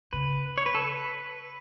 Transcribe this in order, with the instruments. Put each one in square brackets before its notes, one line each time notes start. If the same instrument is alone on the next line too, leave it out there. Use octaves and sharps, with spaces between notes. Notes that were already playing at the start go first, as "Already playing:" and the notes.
[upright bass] C#3 [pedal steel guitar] B4
[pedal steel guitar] C#5
B4
A4
B4